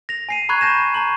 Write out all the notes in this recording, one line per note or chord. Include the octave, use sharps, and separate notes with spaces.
A#6 F7
G#5 C7 D#7
A#5 B5 C#6 F#6 G#6
A5 G6 A#6 E7
A5 A#5 C#6 F#7